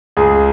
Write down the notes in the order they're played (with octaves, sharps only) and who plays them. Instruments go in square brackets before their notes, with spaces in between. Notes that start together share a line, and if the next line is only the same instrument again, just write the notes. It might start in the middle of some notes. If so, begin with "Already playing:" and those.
[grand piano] C#2 G#4